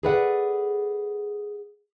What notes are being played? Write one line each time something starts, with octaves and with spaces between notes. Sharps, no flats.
G#4 A4 B4 D5 F5 F#5